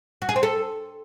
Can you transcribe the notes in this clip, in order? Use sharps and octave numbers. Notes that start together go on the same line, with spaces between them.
F#4
G#4
C4
A4